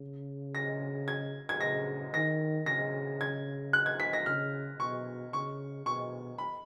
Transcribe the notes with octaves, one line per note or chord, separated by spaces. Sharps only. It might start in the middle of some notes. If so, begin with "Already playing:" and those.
Already playing: C#3
A#6
G#6
G#6
C#3 A#6
D#3 A#6
C#3 A#6
G#6
F#6
G#6
B6
A#6
C#3 F6
B2 C#6
C#3 C#6
B2 C#6
B5